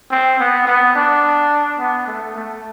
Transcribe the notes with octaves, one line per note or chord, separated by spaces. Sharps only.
C4
B3
B3
D4
B3
A3
A3